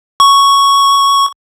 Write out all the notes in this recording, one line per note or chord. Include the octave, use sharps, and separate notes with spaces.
C#6